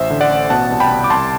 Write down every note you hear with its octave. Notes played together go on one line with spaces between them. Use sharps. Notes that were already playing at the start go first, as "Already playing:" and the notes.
Already playing: A1 C5 E5
D3
D5 F#5
A1
B2 F#5 A5
C2
G5 B5
C2
D6
C2 A5 C6